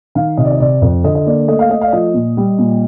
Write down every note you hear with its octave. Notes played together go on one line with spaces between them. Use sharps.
D#3 F5
C3 D#5
D5
D#5
C3 D5
F2
D3 D#5
D#5
A#3 D5
A3 D#5
F5
A3 D#5
F5
D5
F3 D#5
A#2
G3
A#2